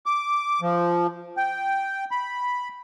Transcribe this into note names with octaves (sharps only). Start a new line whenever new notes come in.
D6
F3
G5
B5